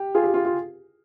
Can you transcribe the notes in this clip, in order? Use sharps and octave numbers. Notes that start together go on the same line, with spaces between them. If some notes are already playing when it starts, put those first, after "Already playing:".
Already playing: G4
F4 G#4
G4
F4
F4